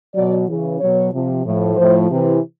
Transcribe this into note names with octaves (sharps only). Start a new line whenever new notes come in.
B2 F#3 D5
C#3 E3
B2 F#3 C#5
C3 F3
A2 F3
A2 F3 C5
C3 E3